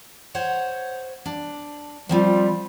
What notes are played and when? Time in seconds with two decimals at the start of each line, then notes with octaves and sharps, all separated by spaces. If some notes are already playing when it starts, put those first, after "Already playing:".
0.35 C5 C#5 F#5
1.26 D4
2.09 F3 G3 C4 F4